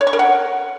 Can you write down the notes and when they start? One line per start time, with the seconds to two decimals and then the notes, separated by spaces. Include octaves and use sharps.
0.01 C#5
0.07 C#6
0.13 A#4
0.19 F#5